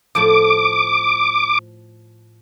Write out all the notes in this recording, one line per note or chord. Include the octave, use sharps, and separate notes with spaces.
A2 F3 D6